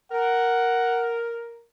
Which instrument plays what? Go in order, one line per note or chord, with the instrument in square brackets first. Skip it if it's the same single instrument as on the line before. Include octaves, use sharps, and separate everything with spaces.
[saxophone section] A#4 [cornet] F#5